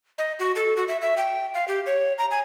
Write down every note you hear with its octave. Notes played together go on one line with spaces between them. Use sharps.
D#5
F#4
A4
F#4
E5
E5
G5
F5
G4
C#5
A#5
G#5